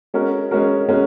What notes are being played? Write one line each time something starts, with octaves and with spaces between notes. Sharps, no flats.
G#3 C#4 F#4 A#4
G#3 C#4 F#4 A#4
G#3 C#4 F#4 A#4